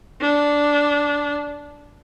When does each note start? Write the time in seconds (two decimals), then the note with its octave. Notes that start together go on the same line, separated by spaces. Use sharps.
0.21 D4